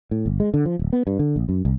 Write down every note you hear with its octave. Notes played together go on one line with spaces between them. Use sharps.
A2
G1
G#3
D3
F3
D1
B3
G2
D3
A#1
F#2
C2